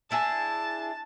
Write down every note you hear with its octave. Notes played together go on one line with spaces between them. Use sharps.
D4 E4 G#4 A5